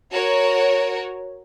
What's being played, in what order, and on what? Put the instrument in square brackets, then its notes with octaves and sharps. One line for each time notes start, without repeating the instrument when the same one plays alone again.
[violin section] F#4 A#4 C#5